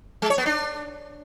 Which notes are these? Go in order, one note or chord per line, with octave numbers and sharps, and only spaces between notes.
G#3
C#5
B3
D4